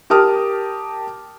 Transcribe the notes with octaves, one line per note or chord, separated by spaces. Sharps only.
G4 A#4 A5 D#6 F6